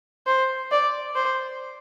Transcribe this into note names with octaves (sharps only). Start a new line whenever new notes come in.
C5
D5
C5